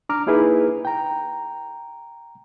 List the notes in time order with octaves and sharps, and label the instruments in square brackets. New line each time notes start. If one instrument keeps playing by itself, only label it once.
[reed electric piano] D4 A#5 D6 F6
A#3 D#4 E4 G#4 B4
G5 A#5